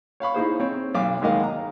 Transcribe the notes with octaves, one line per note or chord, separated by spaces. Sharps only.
C#5 F5 B5 C#6
D#4 E4 G#4 C5
C4 C#5
B1 F5 D6
G#1 D#2 G#3 A#3 D#5 F5
A#5